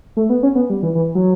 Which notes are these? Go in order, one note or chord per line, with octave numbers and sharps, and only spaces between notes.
A3
B3
C#4
B3
G3
E3
E3
F#3